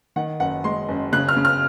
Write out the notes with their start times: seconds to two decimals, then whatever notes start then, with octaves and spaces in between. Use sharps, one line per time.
0.16 D#3 F#5
0.40 F#1 F#5
0.64 G#3 C6
0.88 F#1
1.12 C#3 F#6
1.29 F6
1.37 C#3
1.45 F6